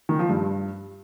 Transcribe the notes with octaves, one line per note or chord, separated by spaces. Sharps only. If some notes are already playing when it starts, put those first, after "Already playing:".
D#3
F3
G2